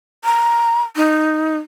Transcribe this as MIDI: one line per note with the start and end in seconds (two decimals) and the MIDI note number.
0.25 0.83 82
0.96 1.57 63